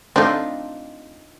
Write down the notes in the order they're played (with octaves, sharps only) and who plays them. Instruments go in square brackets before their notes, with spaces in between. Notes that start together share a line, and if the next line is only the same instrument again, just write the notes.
[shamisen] A3 C4 [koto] D4 D#4 F4